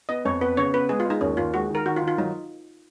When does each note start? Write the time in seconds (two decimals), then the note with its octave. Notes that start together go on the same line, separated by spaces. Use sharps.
0.09 B3 D#5
0.25 F2 C#5
0.41 B3 B4
0.57 C#3 C#5
0.74 B3 B4
0.89 G#3 G#4
1.00 F4
1.05 G#3 D#4
1.21 D#2 C#4
1.37 D#2 F4
1.53 G#3 F#4
1.70 D#3
1.75 A#4
1.86 D#3 F#4
1.96 F4
2.02 D#3
2.08 F4
2.18 F#3 D#4